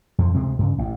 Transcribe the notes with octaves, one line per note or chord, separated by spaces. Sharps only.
F2 F3
D2 C3 G#3 C4
G2 C#3
A1